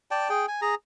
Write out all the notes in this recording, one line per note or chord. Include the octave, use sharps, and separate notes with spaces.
D5 G5 A5
G#4 G5
G#5
G#4 A#5